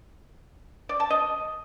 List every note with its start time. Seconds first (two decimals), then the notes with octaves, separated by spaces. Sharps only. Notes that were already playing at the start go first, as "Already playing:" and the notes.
0.89 D5
1.00 A5
1.10 D#5